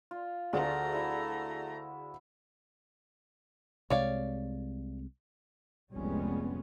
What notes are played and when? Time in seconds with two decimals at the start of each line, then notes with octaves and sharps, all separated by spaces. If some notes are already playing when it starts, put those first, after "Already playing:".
0.11 F4
0.53 D2 A3 F4 G#4 D5 A#5
0.92 E4 E5
3.90 C2 C3 G#3 C#5 D5 F5
5.93 F1 C2 G3 G#3 B3 C#4